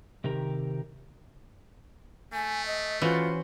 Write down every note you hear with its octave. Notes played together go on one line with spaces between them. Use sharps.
C3 D#3 G4 A#4 A#5
A3 G#5
D#5
E3 C#4 F4 F#4 C5